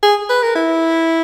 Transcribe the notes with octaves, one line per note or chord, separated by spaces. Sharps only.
G#4
B4
A#4
E4